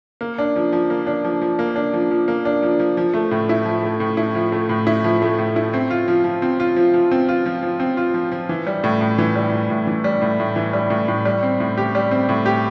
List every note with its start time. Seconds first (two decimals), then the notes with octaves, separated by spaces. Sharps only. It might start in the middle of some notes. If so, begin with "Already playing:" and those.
0.21 A#3
0.38 D4
0.56 F3
0.73 F3
0.90 A#3
1.07 D4
1.25 F3
1.41 F3
1.59 A#3
1.76 D4
1.93 F3
2.11 F3
2.28 A#3
2.45 D4
2.63 F3
2.80 F3
2.97 F3
3.14 A3
3.31 A2
3.49 E4
3.65 F3
3.83 A3
4.00 A2
4.17 E4
4.35 F3
4.52 A3
4.69 A2
4.87 E4
5.04 F3
5.22 A3
5.39 A2
5.56 E4
5.74 C4
5.90 F4
6.08 F3
6.24 F3
6.42 C4
6.60 F4
6.76 F3
6.94 F3
7.11 C4
7.29 F4
7.46 F3
7.63 F3
7.80 C4
7.97 F4
8.14 F3
8.32 F3
8.49 E3
8.67 G3
8.84 A2
9.01 A2
9.18 E3
9.36 G3
9.52 A2
9.70 A2
9.87 E3
10.04 G3
10.22 A2
10.40 A2
10.56 E3
10.73 G3
10.90 A2
11.08 A2
11.25 G3
11.43 C4
11.60 A2
11.77 G4
11.95 G3
12.11 C4
12.29 A2
12.46 G4